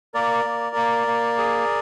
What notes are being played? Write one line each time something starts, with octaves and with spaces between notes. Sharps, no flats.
A#3 A#4 D5
A#3
A#3
A#3
G#4